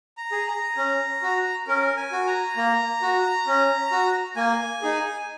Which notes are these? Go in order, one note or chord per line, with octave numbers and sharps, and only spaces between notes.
A#5
G#4
A#5
C#4
F#4
C#4 A#4
G#5
F#4
A#5
A#3
F#4
C#4
F#4
A#3 G#5
D#4 G#4